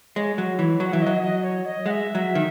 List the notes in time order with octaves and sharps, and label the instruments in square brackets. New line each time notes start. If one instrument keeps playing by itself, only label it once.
[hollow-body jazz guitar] G#3 [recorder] C#5
[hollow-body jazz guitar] F#3
E3
F#3
[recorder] F#5
[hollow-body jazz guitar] E3 [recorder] E5
[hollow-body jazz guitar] F#3 [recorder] D#5
[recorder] D#5
C#5
D#5
[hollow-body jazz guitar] G#3 [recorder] F#5
[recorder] E5
[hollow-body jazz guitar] F#3
D#3